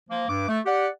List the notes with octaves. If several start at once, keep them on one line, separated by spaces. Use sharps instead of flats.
F3 A#3
G2 D6
A3
G4 D5 F#5